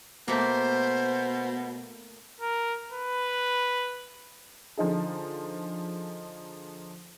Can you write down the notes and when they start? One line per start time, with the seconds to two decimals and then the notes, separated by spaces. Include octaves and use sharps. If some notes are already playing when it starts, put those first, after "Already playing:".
0.28 B2 A3 A#3 C5
2.41 A#4
2.92 B4
4.77 D3 F3 D#4 G#4